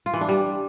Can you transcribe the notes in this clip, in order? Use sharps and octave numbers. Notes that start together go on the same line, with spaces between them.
F4
E3
D4
G3